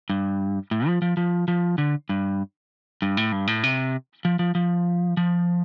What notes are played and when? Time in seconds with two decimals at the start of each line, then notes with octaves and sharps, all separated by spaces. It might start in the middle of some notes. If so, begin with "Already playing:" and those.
0.10 G2
0.71 A2
0.87 F3
1.02 F3
1.17 F3
1.48 F3
1.78 D3
2.09 G2
3.02 G2
3.17 A2
3.32 G2
3.47 A2
3.63 C3
4.25 F3
4.39 F3
4.55 F3
5.17 F3